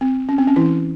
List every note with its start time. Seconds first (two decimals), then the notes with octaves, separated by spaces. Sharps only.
0.01 C4
0.29 C#4
0.38 C4
0.47 C#4
0.56 E3 E4